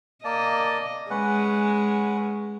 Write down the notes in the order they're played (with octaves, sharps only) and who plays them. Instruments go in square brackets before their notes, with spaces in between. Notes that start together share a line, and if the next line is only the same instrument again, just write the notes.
[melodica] A#3 D5 A5 [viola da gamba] D#5
[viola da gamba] G#3 [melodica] C#4 B4 F#5